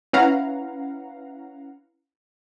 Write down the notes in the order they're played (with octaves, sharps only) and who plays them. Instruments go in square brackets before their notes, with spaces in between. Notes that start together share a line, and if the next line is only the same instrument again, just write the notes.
[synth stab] C#4 E4 B4 F5 F#5 A#5